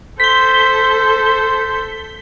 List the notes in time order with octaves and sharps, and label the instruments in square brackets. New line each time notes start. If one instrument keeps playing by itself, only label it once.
[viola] A4 [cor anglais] C5 [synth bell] B6 G7